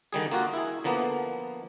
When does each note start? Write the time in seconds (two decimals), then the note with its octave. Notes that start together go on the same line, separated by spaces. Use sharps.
0.13 D3 D#3 G3 G#4
0.32 A#3 F4 F#4
0.54 E4 G#4
0.84 D3 F3 A#3 B3